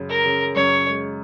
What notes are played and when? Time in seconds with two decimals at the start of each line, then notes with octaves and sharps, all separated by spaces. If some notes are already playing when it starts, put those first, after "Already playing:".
Already playing: F#2 C#3
0.10 A#4
0.25 C#3
0.56 F#2 C#5
0.87 G#3